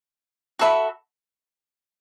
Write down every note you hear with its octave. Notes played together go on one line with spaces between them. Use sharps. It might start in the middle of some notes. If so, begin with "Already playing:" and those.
F#4 A4 E5 B5